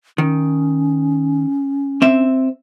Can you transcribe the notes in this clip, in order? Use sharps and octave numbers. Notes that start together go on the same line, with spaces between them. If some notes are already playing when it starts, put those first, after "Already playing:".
D#3 C#4
C4 E5